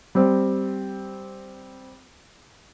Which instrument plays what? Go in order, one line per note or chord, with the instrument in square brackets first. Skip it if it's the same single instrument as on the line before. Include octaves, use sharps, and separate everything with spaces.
[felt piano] G3 C4